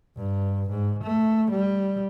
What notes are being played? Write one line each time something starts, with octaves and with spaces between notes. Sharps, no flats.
G2
G#2
A3
G3